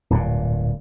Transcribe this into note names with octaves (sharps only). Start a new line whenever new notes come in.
D1 G2 A#2